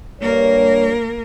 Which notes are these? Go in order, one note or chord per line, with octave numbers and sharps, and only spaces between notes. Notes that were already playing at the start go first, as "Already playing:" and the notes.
G2 A#3 A#4 C#5